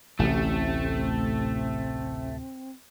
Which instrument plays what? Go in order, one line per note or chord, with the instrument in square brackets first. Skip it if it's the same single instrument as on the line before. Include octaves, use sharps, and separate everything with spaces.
[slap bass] A1 [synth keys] D2 A2 C3 [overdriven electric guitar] A3 [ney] C4